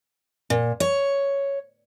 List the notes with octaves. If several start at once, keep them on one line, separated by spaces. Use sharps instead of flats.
A#2
C#5